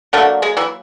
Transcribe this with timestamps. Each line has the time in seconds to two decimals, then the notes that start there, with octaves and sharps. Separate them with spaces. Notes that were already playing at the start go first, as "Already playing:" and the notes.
0.13 D3 F#3 A3 A#3 A4
0.42 G#3 G#4
0.57 E3 E4